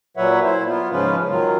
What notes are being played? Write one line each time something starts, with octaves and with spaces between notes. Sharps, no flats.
A#2 F#3 B4 C#5 E5 F#5
E4 C5
B3 F4
G#2 C#3 F3 C#4 F4 B4
D#3 F#3 F4